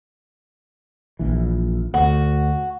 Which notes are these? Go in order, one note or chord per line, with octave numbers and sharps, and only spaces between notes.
A#1 E3
D2 F#4